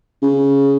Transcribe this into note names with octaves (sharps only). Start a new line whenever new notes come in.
C#3